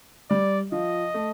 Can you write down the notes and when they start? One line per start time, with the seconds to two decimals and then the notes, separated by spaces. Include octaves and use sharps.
0.30 G3 D5
0.72 F3 D#5
1.14 A3